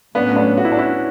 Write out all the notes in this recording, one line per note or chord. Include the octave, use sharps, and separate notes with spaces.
A2 F#3 A3 B3 C#4 D4
B3 D4
F#4
E4
D4
C#4 E4